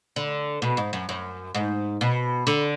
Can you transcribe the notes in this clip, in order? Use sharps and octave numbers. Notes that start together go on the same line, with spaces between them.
D3
B2
G#2
F#2
F#2
G#2
B2
D3